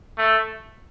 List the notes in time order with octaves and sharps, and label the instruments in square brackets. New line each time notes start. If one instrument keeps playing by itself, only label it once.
[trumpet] A3